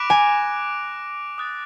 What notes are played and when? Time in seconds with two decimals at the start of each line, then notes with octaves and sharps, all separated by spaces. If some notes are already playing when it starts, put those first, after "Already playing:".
Already playing: B5 D6 F#6 A#6 D7 F7
0.10 G#5
1.38 D#6 F#6 A6